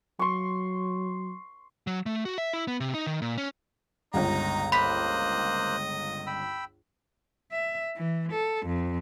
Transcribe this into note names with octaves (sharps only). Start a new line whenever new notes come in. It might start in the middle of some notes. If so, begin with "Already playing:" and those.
F#3 C6 C#6
F#3
A3
F#4
E5
E4
B3
C3
D#4
D#3
A#2
C#4
G1 C#2 D#4 A#5
A#3 C5 D#5 B5 F#6 B6
G5 B5 E6
E5
E3
A4
F2